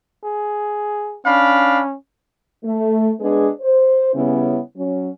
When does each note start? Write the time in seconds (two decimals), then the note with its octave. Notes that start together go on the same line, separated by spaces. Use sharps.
0.24 G#4
1.26 C#4 D4 F5 B5
2.64 A3
3.20 G#3 B3 D4 G#4
3.61 C5
4.14 C#3 G3 B3 C#4 E4
4.76 F#3 C#4